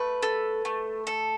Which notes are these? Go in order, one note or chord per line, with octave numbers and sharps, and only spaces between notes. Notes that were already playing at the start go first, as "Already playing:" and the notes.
Already playing: A3 B4
A4
A3
A4